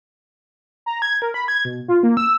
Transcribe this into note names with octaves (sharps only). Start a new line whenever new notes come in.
A#5
G#6
A#4
B5
G#6
B2
F4
A#3
E6